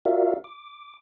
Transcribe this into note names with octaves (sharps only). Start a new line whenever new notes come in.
F4 F#4 A#4 D5 E5 F5
D6